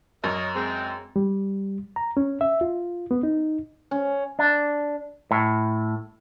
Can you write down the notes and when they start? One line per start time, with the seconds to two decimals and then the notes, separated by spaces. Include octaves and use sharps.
0.24 F#2 A#4 C#5 D#5
0.55 G#3 C4
1.16 G3
1.96 A#5
2.17 C#4
2.41 E5
2.61 F4
3.11 B3
3.23 D#4
3.91 C#4
4.39 D4
5.31 A2